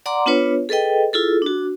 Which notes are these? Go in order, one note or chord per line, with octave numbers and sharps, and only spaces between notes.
D5 F#5 A#5 C6 D6
B3 D4 F4 B4 C#5
G#4 A4 B4 D#5 G5
E4 F4 G#4 A4
D4 F#4